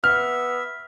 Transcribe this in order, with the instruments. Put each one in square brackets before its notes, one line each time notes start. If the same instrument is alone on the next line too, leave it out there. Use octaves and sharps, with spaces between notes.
[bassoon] B3 [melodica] E5 [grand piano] F6